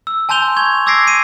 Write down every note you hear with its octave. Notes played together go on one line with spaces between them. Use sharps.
E6
G#5 A5 C6 G6 F7 G7
C#6 G#6 G7
D6 E6 G#6 A#6 C7 D7
C7 D#7